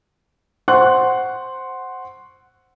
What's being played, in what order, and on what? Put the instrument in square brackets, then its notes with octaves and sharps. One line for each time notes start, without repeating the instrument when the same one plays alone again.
[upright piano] C5 F#5 C6 C#6 F#6